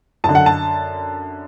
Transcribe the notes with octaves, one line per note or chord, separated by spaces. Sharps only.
F#2 A5
D3
F#5
A5